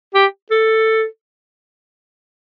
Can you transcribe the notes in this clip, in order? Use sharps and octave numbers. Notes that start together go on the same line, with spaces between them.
G4
A4